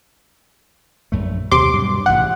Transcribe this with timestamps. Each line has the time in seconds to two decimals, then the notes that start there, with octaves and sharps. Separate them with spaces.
1.12 A#1 F#2 A3
1.51 D#2 C3 C6 D6
1.74 G2 B2 F#3
2.06 A1 G#2 C3 F#5